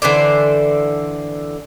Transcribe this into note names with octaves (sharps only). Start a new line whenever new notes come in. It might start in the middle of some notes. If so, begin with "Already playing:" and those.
D3 E3 C5 D5